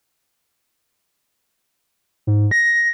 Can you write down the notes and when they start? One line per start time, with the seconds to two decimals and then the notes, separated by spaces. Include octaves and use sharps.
2.27 G#2
2.51 A#6